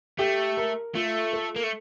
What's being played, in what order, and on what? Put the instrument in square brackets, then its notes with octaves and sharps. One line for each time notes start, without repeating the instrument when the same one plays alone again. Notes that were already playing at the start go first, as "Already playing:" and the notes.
[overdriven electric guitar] A3 [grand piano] G4
[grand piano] A#4
[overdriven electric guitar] A3 [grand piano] F4
[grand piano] A4
[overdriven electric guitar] A#3
A3